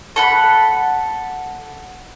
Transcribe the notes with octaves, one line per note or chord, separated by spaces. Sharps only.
A4 F#5 B5